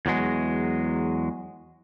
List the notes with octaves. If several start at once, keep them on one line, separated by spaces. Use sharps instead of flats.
E2 F#3 G#3